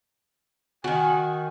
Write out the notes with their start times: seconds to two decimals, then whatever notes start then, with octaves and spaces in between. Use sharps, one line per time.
0.84 D#3 F#4 G#5